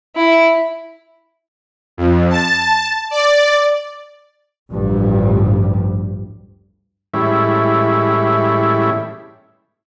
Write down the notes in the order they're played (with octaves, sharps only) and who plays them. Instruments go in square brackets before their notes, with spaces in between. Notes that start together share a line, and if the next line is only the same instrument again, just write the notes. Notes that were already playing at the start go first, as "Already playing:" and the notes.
[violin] E4
[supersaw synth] F2
A5
D5
[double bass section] A1 D2 G2 F3 G3
[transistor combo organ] A2 E3 G3 G#3 C#4 E4